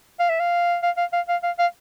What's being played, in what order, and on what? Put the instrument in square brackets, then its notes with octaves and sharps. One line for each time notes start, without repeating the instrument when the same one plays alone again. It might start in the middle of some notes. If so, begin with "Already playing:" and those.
[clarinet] F5
E5
F5
F5
F5
F5
F5
F5
F5